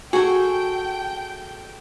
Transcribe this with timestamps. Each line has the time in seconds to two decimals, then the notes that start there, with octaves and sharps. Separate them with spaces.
0.13 F#4 G#4 A4 G5